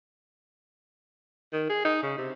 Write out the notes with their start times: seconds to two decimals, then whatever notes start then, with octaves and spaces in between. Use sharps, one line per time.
1.53 D#3
1.69 G#4
1.85 D#4
2.03 C#3
2.18 C3